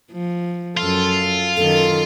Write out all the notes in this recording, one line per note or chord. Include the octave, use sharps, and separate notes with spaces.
F3
F#2 F4 A4
F#2 D#3 A4